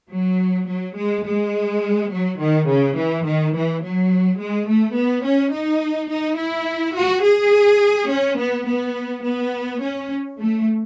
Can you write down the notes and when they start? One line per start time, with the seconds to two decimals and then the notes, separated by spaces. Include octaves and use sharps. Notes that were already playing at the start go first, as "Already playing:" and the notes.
0.12 F#3
0.68 F#3
0.97 G#3
1.26 G#3
2.11 F#3
2.40 D#3
2.69 C#3
2.97 E3
3.26 D#3
3.54 E3
3.82 F#3
4.39 G#3
4.68 A3
4.97 B3
5.25 C#4
5.53 D#4
6.11 D#4
6.39 E4
6.96 F#4
7.24 G#4
8.10 C#4
8.39 B3
8.67 B3
9.24 B3
9.81 C#4
10.38 A3